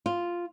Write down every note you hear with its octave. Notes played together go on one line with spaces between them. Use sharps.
F4